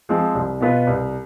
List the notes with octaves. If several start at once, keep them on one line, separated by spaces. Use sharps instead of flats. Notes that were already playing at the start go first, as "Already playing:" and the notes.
F3 G#3 C4
C2
B2 B3 F4 B4
C2